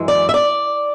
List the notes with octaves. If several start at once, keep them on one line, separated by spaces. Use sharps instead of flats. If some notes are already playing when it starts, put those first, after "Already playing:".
Already playing: F#2 E3 G#3
D5
E5
D5